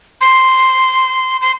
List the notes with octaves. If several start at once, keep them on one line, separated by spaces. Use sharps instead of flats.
C6
C6